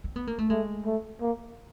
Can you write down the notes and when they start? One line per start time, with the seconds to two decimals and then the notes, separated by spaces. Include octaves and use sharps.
0.04 C4
0.16 B3
0.27 A#3
0.38 A3
0.50 G#3 A3
0.86 A3
1.21 A#3